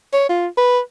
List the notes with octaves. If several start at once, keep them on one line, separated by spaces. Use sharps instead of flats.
C#5
F4
B4